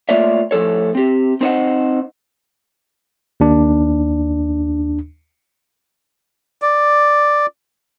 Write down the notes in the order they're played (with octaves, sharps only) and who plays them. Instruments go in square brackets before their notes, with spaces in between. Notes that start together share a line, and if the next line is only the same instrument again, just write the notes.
[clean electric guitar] A3 A#3 F4 C#5 D5 E5
A2 F3 A4 C#5
C4 G4
C4 D#4 C5 C#5 D#5 F#5
[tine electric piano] D#2 D4
[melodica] D5